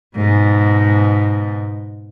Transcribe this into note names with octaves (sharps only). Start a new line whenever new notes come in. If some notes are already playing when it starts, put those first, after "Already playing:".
G#2 B2